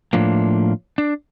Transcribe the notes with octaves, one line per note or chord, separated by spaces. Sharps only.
A2 F3 A#3 D4
D4